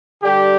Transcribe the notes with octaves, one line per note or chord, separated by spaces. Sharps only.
D3 G3 D4 G4